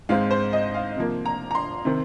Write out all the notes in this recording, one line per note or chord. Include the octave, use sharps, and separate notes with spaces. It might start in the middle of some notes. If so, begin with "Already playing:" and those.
G#2 G#3 C4 F5
C5
D#5
F5
C3 F3 A#3
A#5
A#5
C6
C3 D#3 C4